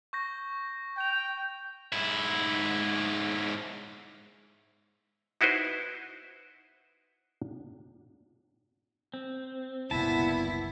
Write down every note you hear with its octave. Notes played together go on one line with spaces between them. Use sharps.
C#6 G6 A#6
G5 A#6 F7
G#2 E4
D#4 E4 F#4 B4 C5
C4
F#1 C2 A#2 B3 E4 A5